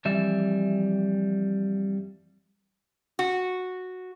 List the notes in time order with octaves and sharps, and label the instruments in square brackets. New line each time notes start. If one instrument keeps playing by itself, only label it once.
[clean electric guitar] F2 E3 G3 E5
[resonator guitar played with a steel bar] F#4